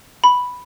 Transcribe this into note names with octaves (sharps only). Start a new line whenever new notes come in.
B5